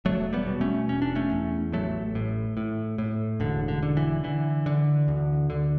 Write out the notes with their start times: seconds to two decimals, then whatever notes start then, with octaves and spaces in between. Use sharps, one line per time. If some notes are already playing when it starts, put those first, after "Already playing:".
0.05 E1 F#3 A3
0.33 G3 B3
0.46 B2
0.61 A3 C#4
0.88 E1 C#4
1.02 D4
1.15 A3 C#4
1.31 E2
1.72 A1 F#3 A3
2.15 A2
2.57 A2
2.98 A2
3.40 E1 D3
3.68 D3
3.83 D3
3.97 E3
4.24 D3 E3
4.66 D3
5.08 D2
5.50 D3